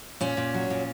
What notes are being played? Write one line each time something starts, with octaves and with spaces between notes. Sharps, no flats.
A#2 C#4
A#2
F#3
A#2